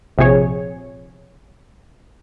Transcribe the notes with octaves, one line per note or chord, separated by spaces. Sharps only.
A#1 C3 F3 G#4 C#5